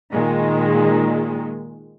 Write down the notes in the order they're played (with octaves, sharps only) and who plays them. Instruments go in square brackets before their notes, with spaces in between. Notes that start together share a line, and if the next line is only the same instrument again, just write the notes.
[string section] A#2 D#3 G#3